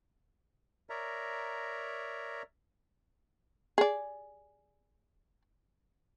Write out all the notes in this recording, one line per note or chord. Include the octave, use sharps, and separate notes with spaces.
A#4 C#5 D5 E5 A#5
G#4 D5